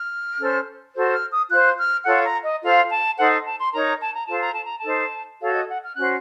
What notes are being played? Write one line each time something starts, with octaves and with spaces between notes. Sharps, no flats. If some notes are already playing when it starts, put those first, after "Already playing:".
Already playing: F6
C#4 A4 C5
F#4 A4 C5
F6
D#6
F4 C5 F#6
F6
F4 A4 C#5 F#5
A#5
D#5
F4 A4 C5 F5
A5
D#4 A4 C5 F#5
A5
C6
D#4 A#4 C#5 A#5
A5
A#5
F4 A4 C5 A5
A#5
A5
A#5
A5
D#4 A4 C5
F#4 A4 C#5 F5
D#5
F#5
F6
C#4 F#4 C5 F#6